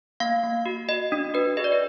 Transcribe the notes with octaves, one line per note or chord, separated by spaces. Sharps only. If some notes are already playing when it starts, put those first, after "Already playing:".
A#3 F5
A#3
F#4
F#4 D#5
D4
F#4 B4
G#4 D#5
D5
B4